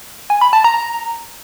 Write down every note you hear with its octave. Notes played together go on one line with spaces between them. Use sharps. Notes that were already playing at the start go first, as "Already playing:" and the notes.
G#5
B5
A5
A#5